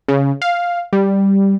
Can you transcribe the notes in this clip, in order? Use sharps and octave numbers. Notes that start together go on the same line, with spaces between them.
C#3
F5
G3